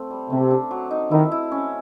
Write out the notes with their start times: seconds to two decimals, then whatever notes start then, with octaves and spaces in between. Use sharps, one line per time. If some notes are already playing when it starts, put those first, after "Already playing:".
Already playing: A3 C4
0.11 G3
0.30 C3 A3
0.51 D4
0.71 F#3
0.91 D#4
1.11 D#3 E4
1.32 E4
1.52 C#4